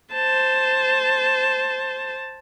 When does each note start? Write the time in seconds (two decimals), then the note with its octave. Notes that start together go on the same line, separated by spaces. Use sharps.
0.13 C5 A5